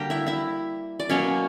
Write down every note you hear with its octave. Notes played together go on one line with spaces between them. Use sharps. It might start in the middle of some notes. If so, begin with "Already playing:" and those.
Already playing: D3 G3 A#3 G4 G5 A#5
E4 E5
E4 E5
D5
B2 F#3 A#3 C#4 C#5